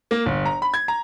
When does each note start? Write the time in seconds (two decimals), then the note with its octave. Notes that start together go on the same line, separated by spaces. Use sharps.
0.11 A#3
0.26 G1
0.46 A#5
0.62 B5
0.74 G#6
0.88 A#5